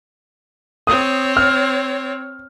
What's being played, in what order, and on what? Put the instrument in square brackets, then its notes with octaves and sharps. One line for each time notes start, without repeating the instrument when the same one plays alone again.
[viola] C4 C#5 [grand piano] D#6
[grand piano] F6